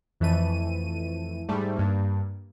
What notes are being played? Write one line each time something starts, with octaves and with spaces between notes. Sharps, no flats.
F2 E3 A3 D#7
G#2 G3 A3
G2 A#3